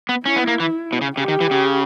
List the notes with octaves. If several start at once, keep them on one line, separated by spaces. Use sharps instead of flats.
B3
C#4 E4
B3
A#3
E3
B2
C#3
C#3 G4
D#3
E3
C#3